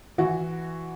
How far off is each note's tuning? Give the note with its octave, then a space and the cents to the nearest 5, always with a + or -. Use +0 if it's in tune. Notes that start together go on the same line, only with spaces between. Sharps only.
E3 +0 F#4 +0